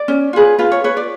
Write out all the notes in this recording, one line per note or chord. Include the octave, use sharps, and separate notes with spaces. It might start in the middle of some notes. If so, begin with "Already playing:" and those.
Already playing: D5
C#4
F4 G#4 B4
F4 B4
C#5
B4 C#5
D5